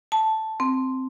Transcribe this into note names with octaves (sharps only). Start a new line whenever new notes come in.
A5
C4